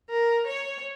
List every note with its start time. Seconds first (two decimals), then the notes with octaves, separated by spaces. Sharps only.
0.09 A#4
0.47 C#5